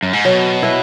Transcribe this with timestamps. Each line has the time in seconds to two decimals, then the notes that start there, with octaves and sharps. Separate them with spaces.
0.03 F#2
0.13 G#2
0.25 B2 F#3
0.63 E4 B4